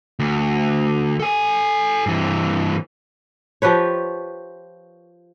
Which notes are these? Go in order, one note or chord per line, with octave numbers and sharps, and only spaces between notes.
D2
A4 G#5
G2 E3
F3 G4 B4 C#5